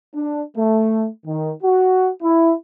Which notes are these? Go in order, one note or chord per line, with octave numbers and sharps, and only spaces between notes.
D4
A3
D#3
F#4
E4